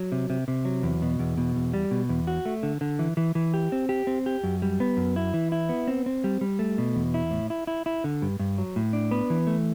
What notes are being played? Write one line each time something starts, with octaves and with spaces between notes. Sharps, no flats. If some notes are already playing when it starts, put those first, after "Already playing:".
Already playing: F#3
C3
C3
C3
F#3
E2
B2
E2
B2
E2
G3
B2
E2
F#4
A3
D3
D3
E3
E3
E3
G4
C4
G4
C4
G4
F#2
G3
B3
F#2
E4
E3
E4
B3
C4
C4
G3
G3
A3
B2
E2
E4
A2
E4
E4
E4
D3
G2
G2
F#3
A2
D4
B3
E3
A3